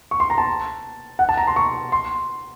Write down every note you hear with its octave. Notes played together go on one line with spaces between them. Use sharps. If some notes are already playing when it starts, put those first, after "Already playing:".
C#6
C6
A#5
A5
F#5
A5
A#5
C6
C#6
C6